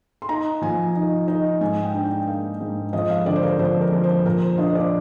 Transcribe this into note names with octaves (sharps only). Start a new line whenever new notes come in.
C6
D#4 A#5
F3 G#5
D#4
D#4
G#2 G#5
G5
D4
G5
A#3 F5
G#2
F2 D#5
F5
D3 D5
C5
A#4
F2 C5
A#4
F2
C5
A#2 A#4
C5
D4 D#5
C5
D5